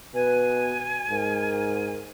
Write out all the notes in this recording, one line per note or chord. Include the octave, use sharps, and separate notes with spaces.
B2 B4 G#5
G#2 A#4